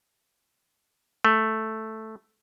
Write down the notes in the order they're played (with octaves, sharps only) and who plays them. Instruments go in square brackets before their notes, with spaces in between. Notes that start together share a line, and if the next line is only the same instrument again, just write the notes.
[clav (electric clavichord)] A3